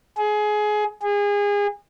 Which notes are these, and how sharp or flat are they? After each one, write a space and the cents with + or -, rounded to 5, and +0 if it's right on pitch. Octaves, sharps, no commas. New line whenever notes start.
G#4 +20
G#4 -30